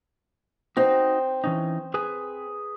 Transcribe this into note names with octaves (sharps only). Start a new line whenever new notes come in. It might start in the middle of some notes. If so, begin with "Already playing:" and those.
C4 D#4 F#4
E3 C#4 D#4
G#4 B4 G#5